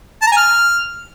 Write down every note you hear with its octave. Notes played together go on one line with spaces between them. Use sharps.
A5
A#5
G#5
F6